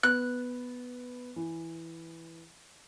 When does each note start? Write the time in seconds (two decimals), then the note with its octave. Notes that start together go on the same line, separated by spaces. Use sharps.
0.03 B3 F#6
1.36 E3